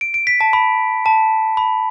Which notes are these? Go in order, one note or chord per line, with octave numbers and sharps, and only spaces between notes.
D7
D7
B6
A5
B5
A5
B5